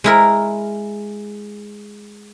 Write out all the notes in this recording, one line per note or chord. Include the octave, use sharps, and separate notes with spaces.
G#3 E4 A#4